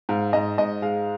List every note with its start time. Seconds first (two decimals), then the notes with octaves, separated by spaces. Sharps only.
0.09 G#2 F5
0.33 G#2 D#5
0.58 G#2 D#5
0.82 G#3 F5